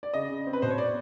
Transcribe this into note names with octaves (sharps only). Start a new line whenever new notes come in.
D5
C#3 D#5
C#3
C4
B4
B2 C5
C#5
D5